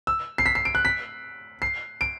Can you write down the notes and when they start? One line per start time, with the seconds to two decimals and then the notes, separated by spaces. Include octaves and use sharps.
0.07 E6
0.38 C7
0.46 B6
0.55 C7
0.65 D7
0.75 F#6
0.85 B6
1.62 C7
2.01 D7